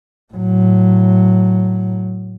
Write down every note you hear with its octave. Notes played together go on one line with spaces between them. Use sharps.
A2 F#3